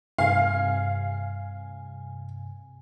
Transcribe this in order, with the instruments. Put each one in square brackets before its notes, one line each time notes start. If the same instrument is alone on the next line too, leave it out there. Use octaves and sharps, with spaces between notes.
[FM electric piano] G2 C3 G#5 [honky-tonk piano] F5